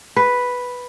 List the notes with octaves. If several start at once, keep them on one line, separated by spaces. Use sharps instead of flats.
B4